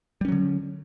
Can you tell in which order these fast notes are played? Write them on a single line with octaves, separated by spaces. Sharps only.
G3 C#4 F#3 D3